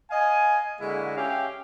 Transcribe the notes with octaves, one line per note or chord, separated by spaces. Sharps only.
D#5 F5 G#5
D3 G#3 A#3 E4 F#4
C#4 G4 E5 F5 G5